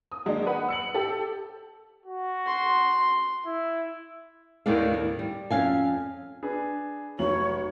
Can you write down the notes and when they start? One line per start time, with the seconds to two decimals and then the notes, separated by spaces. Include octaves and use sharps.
0.12 D#6
0.26 D#3 F#3 G#3 A#3 D4 D#4
0.46 B4 F#5 B5
0.68 E6 C#7 F#7
0.94 G4 A4
2.06 F#4
2.46 C6
3.46 E4
4.66 D#2 A2 D#3 B3 D4 F5
4.94 D#2
5.19 G3
5.51 F2 C#4 F5 G#5
6.43 D4 G#4 B4
7.19 F1 F#3 C#5 F#7